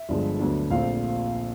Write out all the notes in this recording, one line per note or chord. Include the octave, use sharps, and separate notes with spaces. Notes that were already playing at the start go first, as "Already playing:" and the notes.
Already playing: E5
G1 G2 D3 F3 G#3
D2 D3 F#3 B3 D4
A#1 A#2 F3 A3 C4 F5